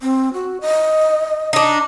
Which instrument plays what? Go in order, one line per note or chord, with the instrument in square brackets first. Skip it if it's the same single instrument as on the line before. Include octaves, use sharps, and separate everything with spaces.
[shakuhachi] C4
F#4
D#5
[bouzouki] D4 D#4